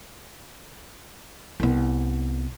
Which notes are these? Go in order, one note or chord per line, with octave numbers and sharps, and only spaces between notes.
C2 B3